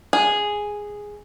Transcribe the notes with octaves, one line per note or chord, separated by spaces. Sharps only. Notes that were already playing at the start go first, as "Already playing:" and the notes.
G#4